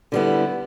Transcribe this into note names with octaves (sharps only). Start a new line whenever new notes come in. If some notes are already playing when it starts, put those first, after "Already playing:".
D3 G3 B3 E4